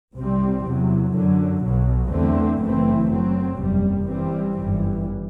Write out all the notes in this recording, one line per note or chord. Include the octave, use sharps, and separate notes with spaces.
C2 C3 G3 C4
E2 C3 F#3
F#2 D3 F#3
B1 B2 F#3
E2 D3 A3 C4
F#1 F#2 E3 A3 C4
F#2 F#3 C4
F#1 E2 C3 G3
F#2 E3 G3 C4
G1 F#2 E3 G3